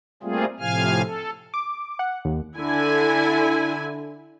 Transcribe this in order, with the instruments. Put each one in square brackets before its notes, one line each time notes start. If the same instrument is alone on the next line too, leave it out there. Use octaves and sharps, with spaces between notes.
[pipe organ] G3 A3 A#3 C4 F4 G#4
A2 C3 F3 F5 G#5 F6
A4
[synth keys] D6
F#5
D#2
[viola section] D3 E4 G#5